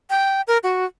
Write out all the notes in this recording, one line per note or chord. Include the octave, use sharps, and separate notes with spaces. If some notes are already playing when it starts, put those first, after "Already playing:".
G5
A#4
F#4